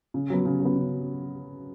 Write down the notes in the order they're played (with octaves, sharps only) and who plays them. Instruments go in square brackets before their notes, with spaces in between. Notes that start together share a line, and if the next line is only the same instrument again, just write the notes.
[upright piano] C#3
F#3 B3
C#3
F#3 B3
C#3